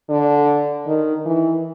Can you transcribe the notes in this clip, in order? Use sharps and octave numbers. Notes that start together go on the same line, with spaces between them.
D3
D#3
E3